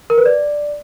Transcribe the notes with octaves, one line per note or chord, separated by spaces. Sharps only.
A#4
B4
D5